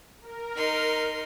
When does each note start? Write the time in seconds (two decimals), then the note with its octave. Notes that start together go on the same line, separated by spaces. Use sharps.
0.21 A#4
0.57 D#4 C6